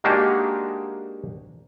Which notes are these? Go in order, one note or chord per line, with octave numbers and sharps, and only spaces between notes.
G#3 A#3 D4 D#4 F#4 G4